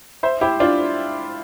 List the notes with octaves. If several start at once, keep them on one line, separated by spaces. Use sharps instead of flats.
C5 E5
E4 G4
D4 F4